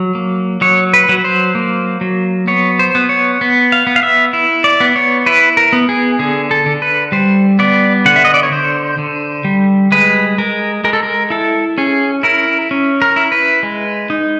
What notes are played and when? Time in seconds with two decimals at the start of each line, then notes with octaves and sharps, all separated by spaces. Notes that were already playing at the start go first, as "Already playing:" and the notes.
Already playing: F#3
0.15 A#3
0.61 F#3 C#5
0.93 B4
1.09 F#3
1.24 C5
1.55 A#3
2.01 F#3
2.47 B3 C#5
2.79 C5
2.95 B3
3.09 C#5
3.41 B3
3.72 F5
3.87 B3
3.96 F5
4.03 E5
4.33 E4
4.64 D5
4.80 B3
4.96 C#5
5.26 E4 B4
5.57 A#4
5.73 B3
5.89 G#4
6.19 D3 G#4
6.51 A4
6.66 D3
6.82 B4
7.12 G3 C5
7.59 B3 D5
8.06 D3 F#5
8.16 E5
8.25 D#5
8.34 D5
8.43 C#5
8.52 D3 C5
8.98 D3
9.45 G3
9.92 G#3 B4
10.38 G#3 A#4
10.84 G#3 A#4
10.93 A4
11.03 A#4
11.30 E4 A4
11.78 C#4 G#4
12.23 E4 A#4
12.71 C#4
13.02 A#4
13.16 E4
13.32 B4
13.63 G#3
14.10 D#4